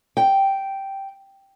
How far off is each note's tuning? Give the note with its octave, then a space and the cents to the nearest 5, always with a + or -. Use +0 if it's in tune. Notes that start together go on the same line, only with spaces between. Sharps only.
G5 -5